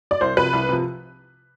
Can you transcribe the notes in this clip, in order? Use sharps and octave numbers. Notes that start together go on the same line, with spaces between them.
D5
C2 C5
C3 F3 B4
C2
C3 F3